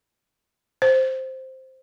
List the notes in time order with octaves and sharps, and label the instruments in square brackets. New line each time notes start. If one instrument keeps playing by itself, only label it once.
[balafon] C5